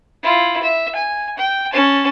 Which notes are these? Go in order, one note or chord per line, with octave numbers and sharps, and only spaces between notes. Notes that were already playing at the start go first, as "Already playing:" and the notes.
E4 F4
E5
G#5
G5
C#4 A5